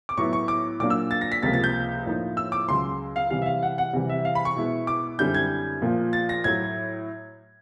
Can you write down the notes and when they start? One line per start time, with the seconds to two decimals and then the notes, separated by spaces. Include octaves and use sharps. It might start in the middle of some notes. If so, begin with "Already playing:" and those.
0.09 D6
0.17 A2 F#3 B3 E4 C#6
0.33 C#6
0.48 D6
0.80 A#2 F#3 A#3 D4 D6
0.90 E6
1.11 A6
1.21 A#6
1.32 B6
1.42 C#2 C3 F3 A#3 A6
1.54 A6
1.64 G6
2.06 A2 F3 A#3 D#4
2.37 E6
2.52 D6
2.68 C#2 C#3 F#3 C6
3.16 F5
3.30 C3 E3 G3 F5
3.42 E5
3.46 F5
3.63 F#5
3.78 F#5
3.93 C3 E3 G3
4.09 E5
4.25 F5
4.35 B5
4.45 C#6
4.56 B2 G#3 B3 E4
4.87 D6
5.19 F#2 D3 G3 C4 E4 G6
5.34 G#6
5.82 A#2 F3 A#3
6.13 A6
6.29 A#6
6.44 A2 F#3 G#6